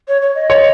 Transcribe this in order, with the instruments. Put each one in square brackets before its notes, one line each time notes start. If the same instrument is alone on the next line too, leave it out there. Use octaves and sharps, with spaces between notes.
[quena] C#5
C#5
D#5
[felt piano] C#5